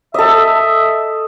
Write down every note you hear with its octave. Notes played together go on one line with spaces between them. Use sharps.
A4 D#5 E5